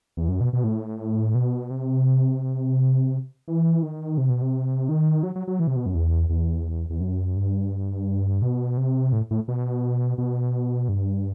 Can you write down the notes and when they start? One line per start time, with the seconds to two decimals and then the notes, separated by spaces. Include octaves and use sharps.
0.17 E2
0.28 F#2
0.41 B2
0.53 B2
0.64 A2
1.35 B2
1.70 C3
3.48 E3
3.83 D#3
4.18 C3
4.29 B2
4.42 C3
4.89 D#3
5.23 F#3
5.35 F#3
5.47 F#3
5.60 E3
5.67 C3
5.76 B2
5.86 F#2
5.95 E2
6.29 E2
6.90 E2
7.00 F#2
7.36 G2
8.42 B2
8.77 C3
9.13 A2
9.31 A2
9.48 B2
10.18 B2
10.89 G2